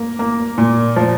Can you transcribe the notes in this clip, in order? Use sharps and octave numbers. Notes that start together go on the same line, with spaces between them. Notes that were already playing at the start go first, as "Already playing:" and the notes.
Already playing: A#3
A#3
A#2
F3